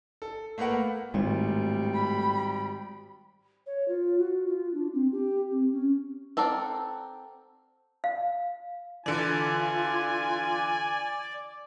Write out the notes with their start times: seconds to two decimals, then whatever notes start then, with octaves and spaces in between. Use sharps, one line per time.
0.22 A4
0.58 A3 A#3 A#4 B4 F#5
1.14 G#1 A2 G3
1.95 B5
3.66 C#5
3.88 F4
4.19 F#4
4.47 F4
4.74 D4
4.94 C4
5.12 G4
5.51 C4
5.72 C#4
6.37 C4 A4 A#4 D5 F#5
8.04 F5
9.06 D3 E3 F4 D5 G#5